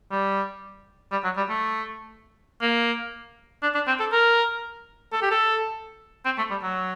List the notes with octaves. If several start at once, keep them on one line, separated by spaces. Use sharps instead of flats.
G3
G3
F#3
G3
A3
A#3
D4
D4
C4
A4
A#4
A4
G4
A4
C4
A3
G3
F#3